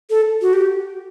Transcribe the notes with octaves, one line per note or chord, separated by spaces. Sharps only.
A4
F#4
G4